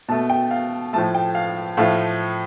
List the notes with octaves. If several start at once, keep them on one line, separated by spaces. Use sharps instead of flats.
B2 A3 A5
G5
F5
A2 F3 A3 A5
G5
F5
A2 F3 A3 F5